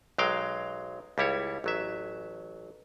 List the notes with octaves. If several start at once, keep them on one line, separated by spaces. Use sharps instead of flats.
B1 F#3 G#3 F5 G5
C#2 G3 E4 C#5
A1 F#3 E5